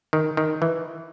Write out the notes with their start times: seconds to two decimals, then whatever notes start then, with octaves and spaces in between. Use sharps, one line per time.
0.13 D#3
0.37 D#3
0.62 E3